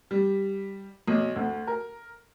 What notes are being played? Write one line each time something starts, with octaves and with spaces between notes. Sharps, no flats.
G3
B1
D2
A#4